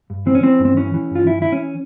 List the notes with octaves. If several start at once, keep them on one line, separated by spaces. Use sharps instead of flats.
G2
E3 C4
C#4
E3 C4
G2
C4
E3 C#4
E3
G2 F4
E3 E4
E3 E4
C#4